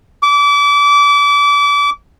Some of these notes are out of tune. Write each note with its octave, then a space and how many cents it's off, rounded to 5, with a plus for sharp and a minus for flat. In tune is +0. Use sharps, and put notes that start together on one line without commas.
D6 -30